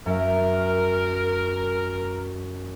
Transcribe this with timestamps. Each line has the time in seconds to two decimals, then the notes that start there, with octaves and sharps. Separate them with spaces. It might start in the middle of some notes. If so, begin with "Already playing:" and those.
0.06 F#2 A#4 E5